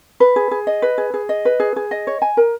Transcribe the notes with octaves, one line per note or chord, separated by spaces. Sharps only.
B4
G#4
G#4
D#5
B4
G#4
G#4
D#5
B4
G#4
G#4
D#5
C#5
G#5
A#4